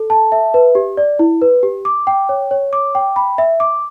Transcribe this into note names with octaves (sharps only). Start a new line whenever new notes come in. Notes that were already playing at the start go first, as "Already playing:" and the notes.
Already playing: A4
A5
E5
B4
G4
D5
E4
B4
G4
D6
G5
C#5
C#5
D6
G5
B5
E5
D6